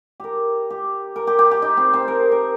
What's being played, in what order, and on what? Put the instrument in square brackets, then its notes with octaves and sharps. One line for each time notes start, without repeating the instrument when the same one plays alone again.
[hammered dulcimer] G4 A#4
G4
A#4
G4
G4
G4
D#4
C4
C4
A#4
A#4